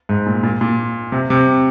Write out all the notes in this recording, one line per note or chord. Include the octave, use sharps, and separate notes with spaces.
G#2
A#2
A#2
A#2
C3
C3